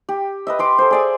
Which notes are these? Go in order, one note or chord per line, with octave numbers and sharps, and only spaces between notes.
G4
B4 D#5 E5
B5 C6 D6
A4 C5
G#4 D5 G#5